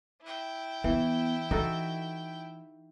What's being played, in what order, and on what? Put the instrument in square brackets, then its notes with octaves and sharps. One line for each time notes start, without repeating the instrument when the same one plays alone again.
[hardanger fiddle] E4 G5
[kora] E3 [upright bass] B3
[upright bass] E3 [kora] D#4 F#4 A4